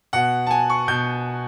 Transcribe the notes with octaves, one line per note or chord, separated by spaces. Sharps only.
B2 F#5
A5
G#5
C#6
B2 G6